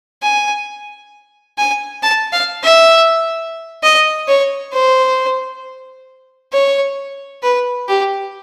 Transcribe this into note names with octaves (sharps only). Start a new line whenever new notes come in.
G#5
G#5
A5
F5
E5
D#5
C#5
C5
C#5
B4
G4